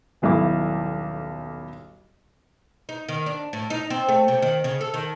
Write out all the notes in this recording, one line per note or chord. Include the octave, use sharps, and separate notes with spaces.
D#1 B1 E4 D6
D#4
D#3
D4
A2
D#4
C4
A3
C3
D#3
C#3
A4
D#3